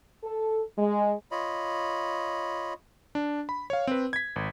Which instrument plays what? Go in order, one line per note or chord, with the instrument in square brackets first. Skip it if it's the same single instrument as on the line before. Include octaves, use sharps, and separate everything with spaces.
[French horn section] A4
G#3
[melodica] F4 C#5 D#5 B5
[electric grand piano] D4
B5
C#5 F5
C4 B4
G#6 B6
G#1